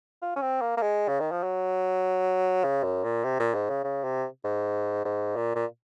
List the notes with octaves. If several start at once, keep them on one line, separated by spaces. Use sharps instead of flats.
F4
C#4
C4
A#3
A#3
G#3
C#3
D#3
F3
F#3
C#3
F#2
A#2
C3
A#2
G#2
C#3
C#3
C3
G#2
G#2
A#2
A#2